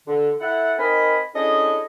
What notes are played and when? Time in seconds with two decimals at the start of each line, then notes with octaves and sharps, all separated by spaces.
0.07 D3
0.40 E4 A4 F#5
0.78 C4 D#4 A#4 D#5 G#5 B5
1.34 C#4 D4 E4 G#4 A4 D#5